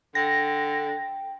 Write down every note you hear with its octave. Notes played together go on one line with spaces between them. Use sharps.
D3 G5 A#6